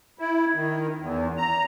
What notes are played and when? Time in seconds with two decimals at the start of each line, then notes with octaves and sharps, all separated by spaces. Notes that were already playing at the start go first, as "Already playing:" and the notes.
0.19 E4
0.55 D#3
1.00 E2
1.37 A#5